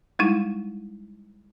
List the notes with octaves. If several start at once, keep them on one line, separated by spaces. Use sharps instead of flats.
G3 G#3 D#4 E4